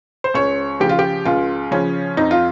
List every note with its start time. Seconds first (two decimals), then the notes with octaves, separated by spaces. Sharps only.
0.24 C5
0.34 C#2 C#5
0.80 C#3 F3 G4
0.89 F4
0.99 G4
1.25 C#2 F4
1.71 C#3 F3 C#4
2.17 F2 D#4
2.31 F4